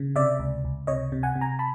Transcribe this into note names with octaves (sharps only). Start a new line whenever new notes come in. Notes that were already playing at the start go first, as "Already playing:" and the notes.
Already playing: C#3
C3 D5 E5
C#2
C#2
C3 C#5 D#5
C3
F#5 G#5
C3
G#5 A#5
A5 B5